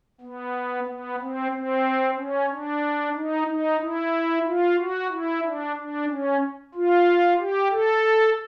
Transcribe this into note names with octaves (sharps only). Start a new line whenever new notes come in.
B3
B3
C4
C4
C#4
D4
D#4
D#4
E4
F4
F#4
E4
D4
D4
C#4
F4
G4
A4